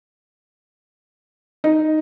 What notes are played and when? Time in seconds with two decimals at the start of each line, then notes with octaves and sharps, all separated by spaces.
1.64 D#4